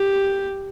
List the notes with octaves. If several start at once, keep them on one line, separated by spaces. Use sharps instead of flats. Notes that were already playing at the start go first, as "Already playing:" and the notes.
Already playing: G4